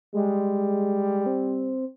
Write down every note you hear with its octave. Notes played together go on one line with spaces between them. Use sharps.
G3 G#3
C4